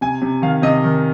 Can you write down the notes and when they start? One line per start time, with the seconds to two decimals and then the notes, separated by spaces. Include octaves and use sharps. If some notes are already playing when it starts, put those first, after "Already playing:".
0.01 C3 G#5
0.22 C3
0.42 D#3 F5
0.62 C3 D#5
0.84 D#3